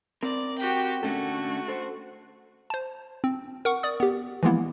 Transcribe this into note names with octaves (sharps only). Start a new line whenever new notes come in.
C4 A#4 D5
F#4 G4 G5
D3 A3 C#4 F#4 A4
A4 C5
C5 A5
C4
A#4 F#5 C#6
D5 D#6
B3 G4
E3 F3 G#3 A#3 B3 E4